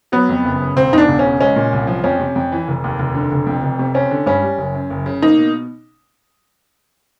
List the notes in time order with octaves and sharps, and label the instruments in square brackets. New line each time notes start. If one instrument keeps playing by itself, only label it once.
[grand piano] F#3 [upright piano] B3
[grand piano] F2
F#1
C#3
[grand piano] E1 [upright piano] C4
[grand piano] E2 [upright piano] D#4
[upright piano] D4
[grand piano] E1
[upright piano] C#4
[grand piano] C#3
[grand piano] G#3 [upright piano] C#4
[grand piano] A#2
C2
F3
[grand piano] F2 [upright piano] C#4
[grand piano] C3
F2
E3
F1
D#2
F1
D3
F1
F2
F1
C3
[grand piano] C4 [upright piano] C#4
[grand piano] D3
[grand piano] G2 [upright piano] C#4
[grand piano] G3
F#1
F#2
F#1
C#3
[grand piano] A#3 [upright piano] D#4
[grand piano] B2